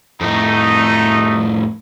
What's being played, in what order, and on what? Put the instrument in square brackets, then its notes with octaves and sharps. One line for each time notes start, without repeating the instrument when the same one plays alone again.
[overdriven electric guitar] F2 A2 [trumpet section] A3 D#4